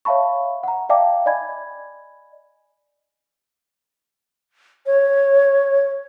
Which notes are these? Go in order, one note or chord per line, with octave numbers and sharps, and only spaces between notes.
C#5 E5 F5 A5 B5 C#6
F#5 A#5
D5 E5 F5 G5 A5 D6
D5 D#5 G#5 B5 G#6
C#5